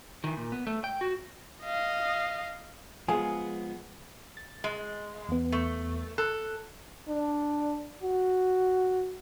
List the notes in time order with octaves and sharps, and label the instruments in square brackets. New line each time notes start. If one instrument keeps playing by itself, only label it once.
[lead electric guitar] D#3 E3
A#2
B3
A3
G5
F#4
[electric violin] D#5 F5
[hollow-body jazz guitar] F3 G#3 B3 [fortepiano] G#4
[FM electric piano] A6
[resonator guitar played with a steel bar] G#3
[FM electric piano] E2 B3
[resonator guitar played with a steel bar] A3
[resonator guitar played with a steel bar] A4 [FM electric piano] F#6
[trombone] D4
F#4